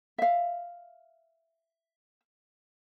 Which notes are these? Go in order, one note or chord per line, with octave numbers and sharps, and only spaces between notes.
E5 F5